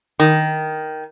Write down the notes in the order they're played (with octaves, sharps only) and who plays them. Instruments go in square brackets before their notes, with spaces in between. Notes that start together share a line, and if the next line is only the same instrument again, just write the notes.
[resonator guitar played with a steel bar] D#3